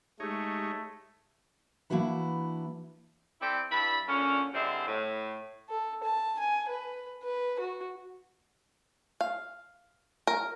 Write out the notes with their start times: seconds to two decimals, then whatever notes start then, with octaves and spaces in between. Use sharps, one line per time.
0.20 G#3 A3 D#4 G4 C#5
1.90 E3 A#3 D4 E4 F#4 B4
3.41 C4 E4 A4 D5 G5
3.71 G2 E4 A5 B5
4.07 A#2 D3 C#4
4.53 D3 G3 G#3 C4 E4
4.87 A2
5.69 A4
6.03 A5
6.39 G#5
6.69 B4
7.23 B4
7.59 F#4
9.21 F5
10.27 A#4